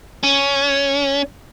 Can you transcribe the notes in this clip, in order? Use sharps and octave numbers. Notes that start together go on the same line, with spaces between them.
C#4